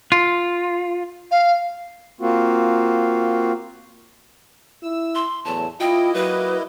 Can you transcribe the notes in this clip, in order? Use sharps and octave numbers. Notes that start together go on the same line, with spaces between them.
F4
F5
A#3 C4 F4 F#4
E4 E6
C6
E2 A2 F#3 A3 A5
A#3 E4 F4 D#5 G5
F#3 B4